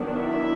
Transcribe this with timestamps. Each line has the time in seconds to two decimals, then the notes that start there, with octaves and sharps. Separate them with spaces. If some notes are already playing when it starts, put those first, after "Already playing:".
Already playing: D#3 F#3 B3 D4
0.15 E4 E5